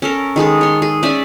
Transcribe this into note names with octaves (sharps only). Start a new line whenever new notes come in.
C#4 A4 A#4
D#3 G#3 G#4 A4
C#5 C6
G#4
C#4 D5 E5 G#5